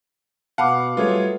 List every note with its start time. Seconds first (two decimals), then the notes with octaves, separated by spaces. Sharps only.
0.58 B2 F5 F#5 A5 B5 D6
0.97 F#3 G3 A3 F4 G#4 B4 C#5